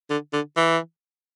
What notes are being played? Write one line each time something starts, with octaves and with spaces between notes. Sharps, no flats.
D3
D3
E3